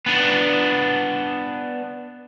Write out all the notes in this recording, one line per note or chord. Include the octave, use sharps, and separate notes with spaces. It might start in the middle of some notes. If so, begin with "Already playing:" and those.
B3 D4